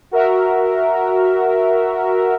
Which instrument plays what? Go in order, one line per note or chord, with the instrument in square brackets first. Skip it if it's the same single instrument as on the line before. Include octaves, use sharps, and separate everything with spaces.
[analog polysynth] F#4 A#4 E5